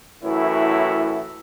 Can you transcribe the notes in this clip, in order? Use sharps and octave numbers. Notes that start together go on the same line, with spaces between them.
F#2 A2 E3 A3 E4 F#4